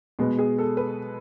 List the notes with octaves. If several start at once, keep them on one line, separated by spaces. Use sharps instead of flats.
B2 G#3 B3
G#4
A4
B4